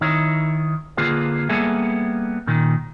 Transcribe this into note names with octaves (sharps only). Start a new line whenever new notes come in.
D#3 D#4 E4 C#5
D3 A#3 F4 G#4 B4
G3 A#3 B3 G#4 A4 E5
A#2 D#3